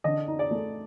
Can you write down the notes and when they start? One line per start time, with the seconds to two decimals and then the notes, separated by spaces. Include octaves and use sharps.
0.04 D3 D#5
0.28 D#4
0.39 D5
0.51 A3